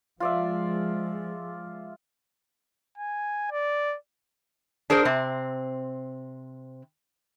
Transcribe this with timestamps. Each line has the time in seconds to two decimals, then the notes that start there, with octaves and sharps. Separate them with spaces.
0.20 F3 G#3 F4 D5 E5
2.98 G#5
3.51 D5
4.90 D4 G#4 A#4 C5
5.05 C3 C4